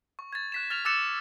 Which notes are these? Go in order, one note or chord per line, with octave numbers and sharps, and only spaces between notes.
C#6
G#6 A6
F#6 B6 E7
F6 A6 F7
D6 E6 F#6 A6 C#7 E7